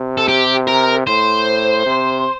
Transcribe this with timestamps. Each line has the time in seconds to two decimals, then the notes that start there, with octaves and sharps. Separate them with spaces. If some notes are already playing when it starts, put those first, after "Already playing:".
Already playing: C3
0.18 A4
0.28 G4
0.67 A#4
1.07 A2 C5
1.86 C3